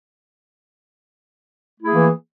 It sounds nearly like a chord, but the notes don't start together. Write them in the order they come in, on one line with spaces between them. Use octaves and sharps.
A3 E4 G#4 A#3 E3